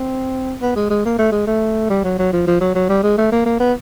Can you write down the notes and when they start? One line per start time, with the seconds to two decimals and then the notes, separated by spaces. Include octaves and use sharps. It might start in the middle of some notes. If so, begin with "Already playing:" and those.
Already playing: C4
0.61 B3
0.76 G#3
0.90 G#3
1.05 A#3
1.18 A3
1.32 G#3
1.47 A3
1.90 G3
2.04 F#3
2.19 F#3
2.33 F3
2.47 F3
2.60 F#3
2.75 F#3
2.89 G3
3.03 G#3
3.17 A3
3.32 A#3
3.46 A#3
3.60 B3